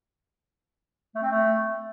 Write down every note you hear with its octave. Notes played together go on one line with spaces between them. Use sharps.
A3
C4
A3